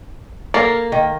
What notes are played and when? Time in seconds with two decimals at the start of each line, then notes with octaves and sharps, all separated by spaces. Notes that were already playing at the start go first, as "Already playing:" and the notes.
0.54 A#3 A4 A#4 F5
0.92 D#3